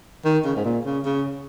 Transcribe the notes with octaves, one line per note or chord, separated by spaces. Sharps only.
D#3
C#3
G#2
A#2
C#3
C#3